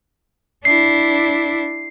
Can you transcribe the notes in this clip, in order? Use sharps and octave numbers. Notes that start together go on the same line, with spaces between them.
D4 E4 C7